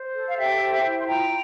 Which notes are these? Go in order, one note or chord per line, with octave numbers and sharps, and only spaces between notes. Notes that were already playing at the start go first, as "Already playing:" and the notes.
Already playing: C5
A4
F5
G4 E5 G5
C5
E4
C6
F4 G5 A#5